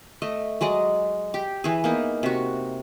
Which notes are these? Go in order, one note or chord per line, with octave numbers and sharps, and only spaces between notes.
A3 D#5
F#3 G#3 D5 D#5
G4
E3 G#4
A#3 B3 D#4
C3 F#4